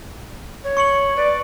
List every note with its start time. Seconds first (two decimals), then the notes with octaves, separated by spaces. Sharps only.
0.64 C#5
0.77 C#6 C#7 F#7
1.16 B4 D5